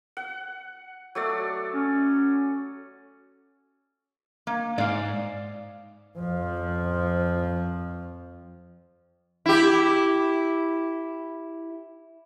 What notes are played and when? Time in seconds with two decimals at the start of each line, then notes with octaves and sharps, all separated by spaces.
0.17 F#5
1.15 F#3 A3 D5
1.74 C#4
4.47 A#3
4.78 G#2 D5 F5
6.18 F2 F3
9.46 E4 G4